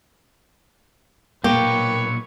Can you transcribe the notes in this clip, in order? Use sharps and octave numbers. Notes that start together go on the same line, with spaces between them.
B1 A#2 A#3 G4 B4 C#5 C#6